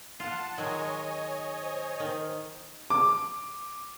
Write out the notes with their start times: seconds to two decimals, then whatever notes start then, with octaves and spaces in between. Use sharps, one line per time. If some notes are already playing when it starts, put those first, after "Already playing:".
0.20 F4 F#5 A5
0.58 D#3 F#3 G#3 C#5 D#5 G#5
1.63 C5
2.00 D#3
2.90 D6